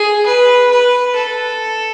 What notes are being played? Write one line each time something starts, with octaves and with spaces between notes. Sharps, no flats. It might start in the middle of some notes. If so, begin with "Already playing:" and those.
Already playing: G#4
B4
B4
A4